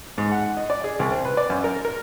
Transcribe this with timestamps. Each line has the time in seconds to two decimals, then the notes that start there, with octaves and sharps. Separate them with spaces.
0.18 G#2
0.32 F#5
0.57 D#5
0.70 D5
0.84 G#4
0.99 C2
1.10 C4
1.25 B4
1.37 D5
1.50 F#2
1.64 A#4
1.85 A#4